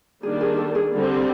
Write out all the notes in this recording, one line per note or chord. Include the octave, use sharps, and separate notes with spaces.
D#3 G3 A#3 D4 G#4
G#4
A4
G#4
D3 G3 C4